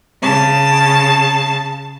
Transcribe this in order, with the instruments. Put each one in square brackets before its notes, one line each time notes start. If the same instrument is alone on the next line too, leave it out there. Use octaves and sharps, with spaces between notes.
[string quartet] C#3 A5